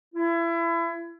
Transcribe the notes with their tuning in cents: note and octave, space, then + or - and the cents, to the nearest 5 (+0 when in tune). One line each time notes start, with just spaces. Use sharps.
E4 +30